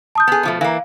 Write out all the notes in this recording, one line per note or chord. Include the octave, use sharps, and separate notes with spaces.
A5 D#6 G6
B3 G#4
B2 F3 A3
E3 A#3 F5